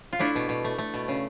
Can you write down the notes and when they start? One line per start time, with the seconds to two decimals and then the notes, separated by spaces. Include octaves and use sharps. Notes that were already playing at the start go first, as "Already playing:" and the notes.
0.13 F4
0.19 A3 D4 E4
0.35 B2
0.49 B2
0.64 A3
0.78 A3
0.94 B2
1.08 C#3